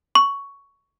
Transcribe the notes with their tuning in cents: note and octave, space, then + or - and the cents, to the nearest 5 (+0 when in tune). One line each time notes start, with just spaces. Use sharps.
C#6 +10